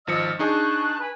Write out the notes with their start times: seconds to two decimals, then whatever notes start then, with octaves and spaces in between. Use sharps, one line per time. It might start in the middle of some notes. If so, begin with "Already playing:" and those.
0.07 G#1 F3 D#5 E6 F6 C#7
0.39 D4 D#4 G#4 A5 C#6 F#6
1.00 B4 G#5 B5